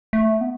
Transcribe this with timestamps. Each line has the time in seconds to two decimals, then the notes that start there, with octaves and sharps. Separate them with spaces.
0.13 A3
0.41 B3